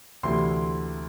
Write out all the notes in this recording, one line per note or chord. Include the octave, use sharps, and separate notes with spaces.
D2 C3 E3 A3 E4 C6